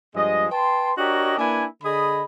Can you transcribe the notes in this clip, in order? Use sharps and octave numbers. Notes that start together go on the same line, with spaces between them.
G2 F3 G#3 D#5
B4 G5 A5 C6
D4 F#4 G4 A#4 C#5 D#5
A#3 D4 E4 B4 G#5
D3 G#4 D#5 B5